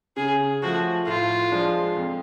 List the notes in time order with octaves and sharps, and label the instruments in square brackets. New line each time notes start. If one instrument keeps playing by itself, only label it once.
[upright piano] C#3 [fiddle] G#4
[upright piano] F3 A3 [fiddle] F#4
[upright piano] A2 [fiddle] F4
[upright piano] F3 G#3 D4
F2